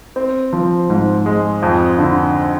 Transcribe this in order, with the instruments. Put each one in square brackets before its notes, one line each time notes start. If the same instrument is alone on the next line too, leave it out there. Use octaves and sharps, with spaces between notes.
[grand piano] C4
F3
G#2
G#3
F2
D3